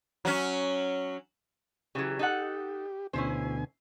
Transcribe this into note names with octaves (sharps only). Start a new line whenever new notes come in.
F#3 C#4
C#3 E3 F#3 G4
D#4 A4 F#5
D2 B2 C#4 E4 C5 G#5